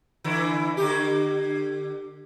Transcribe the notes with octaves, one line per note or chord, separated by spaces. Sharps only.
D3 E3 E4
D3 G4